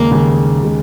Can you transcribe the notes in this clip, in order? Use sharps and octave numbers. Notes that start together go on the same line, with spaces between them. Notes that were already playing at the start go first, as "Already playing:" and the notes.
Already playing: D#2 C#3 G#3 A#3
D#2 C#3 G#3
C#3 G#3